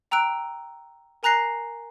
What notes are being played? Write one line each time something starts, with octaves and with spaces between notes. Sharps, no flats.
G5 A#5 E6 F#6 D7
A#4 G#5 A#5 F#6 A#6 C7